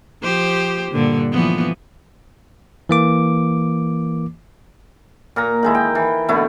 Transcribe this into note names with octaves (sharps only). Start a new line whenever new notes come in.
F3 G4 C5
G2 A#2 D3
E3 F3 B3
E3 A#3 D6
A#2 A#4 A#5
D#3 G#3 E4
G5
E3
B2 D3 A3 E4